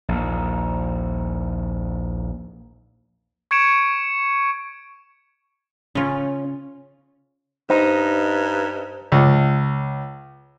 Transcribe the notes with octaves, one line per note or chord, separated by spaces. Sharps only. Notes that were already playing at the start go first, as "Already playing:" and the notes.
A#1 D#2
C#6 G#6 C#7 D7 E7
C#3 C#4 F4
G2 D#4 C5
C#2